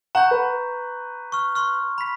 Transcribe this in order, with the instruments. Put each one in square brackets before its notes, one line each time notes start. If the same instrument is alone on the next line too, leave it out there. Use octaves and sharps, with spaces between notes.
[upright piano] F#5 [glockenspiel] A#5 C#6 G6
[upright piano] B4
[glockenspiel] C#6 F6
C6 C#6 F6
B5 B6